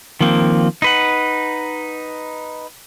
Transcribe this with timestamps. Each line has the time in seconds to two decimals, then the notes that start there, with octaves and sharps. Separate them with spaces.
0.21 D#3 F3 A#3 C4
0.82 D#4 B4 F#5